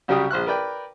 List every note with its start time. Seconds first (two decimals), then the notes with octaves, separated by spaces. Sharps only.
0.08 C2 C#3 F#3 G3 G5 D#6
0.31 A#1 C5 F6 F#6
0.47 A#4 B4 D5 G5